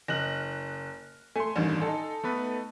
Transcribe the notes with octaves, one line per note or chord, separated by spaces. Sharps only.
F#1 D#5 F6 F#6 A#6 F#7
A3 G#5 C6
A1 G2 D#3
D#4 A4
A3 B3 B4